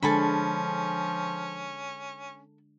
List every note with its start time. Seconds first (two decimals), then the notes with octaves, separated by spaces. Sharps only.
0.03 D3 F3 G#3 C#4 D4 A4 G#5 B5